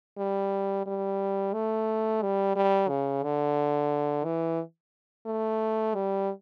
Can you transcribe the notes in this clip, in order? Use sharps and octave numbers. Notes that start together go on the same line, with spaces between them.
G3
G3
A3
G3
G3
C#3
D3
E3
A3
G3